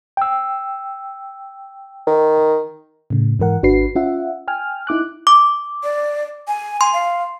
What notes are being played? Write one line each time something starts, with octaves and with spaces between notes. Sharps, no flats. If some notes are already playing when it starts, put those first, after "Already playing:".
G5 E6
D#3
A2 C#3
G#2 E3 A#4 F#5
G#1 D4 F#4 B4 C7
C#4 F4 E5 F#5
G5 G#5 F6
D#4 E4 D6 F#6
D6
D5
G#5
G#5 C6
F5